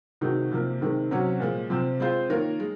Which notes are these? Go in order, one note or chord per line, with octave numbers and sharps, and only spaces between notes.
C3 D#3 G#3 D#4 F#4
C3 F3 A#3
C3 D#3 G#3
C3 F#3 C#4 F#4 C#5
A#2 F3 G#3
C3 F3 C4
G#3 C4 F4 C5
D#3 A#3 F4 A#4 C#5
G#3